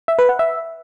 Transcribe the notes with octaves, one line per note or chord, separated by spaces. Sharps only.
E5
B4
F#5
E5